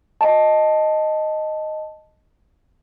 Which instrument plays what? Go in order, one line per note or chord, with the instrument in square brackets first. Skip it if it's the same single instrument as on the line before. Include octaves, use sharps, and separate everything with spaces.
[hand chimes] D#5 A5